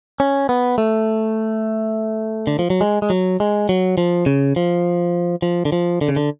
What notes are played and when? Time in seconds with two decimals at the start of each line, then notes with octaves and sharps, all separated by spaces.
0.20 C#4
0.49 B3
0.78 A3
2.47 D3
2.59 F3
2.70 F#3
2.81 G#3
3.02 G#3
3.10 F#3
3.40 G#3
3.69 F#3
3.98 F3
4.26 C#3
4.56 F3
5.42 F3
5.65 D3
5.72 F3
6.01 D3
6.09 C#3
6.16 D3